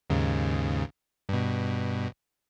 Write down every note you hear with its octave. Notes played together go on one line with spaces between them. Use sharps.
D#2 G#2 C#3
G2 B2